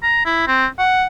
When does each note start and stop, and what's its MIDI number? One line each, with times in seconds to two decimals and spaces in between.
0.03 0.25 82
0.26 0.43 64
0.47 0.66 60
0.79 1.06 78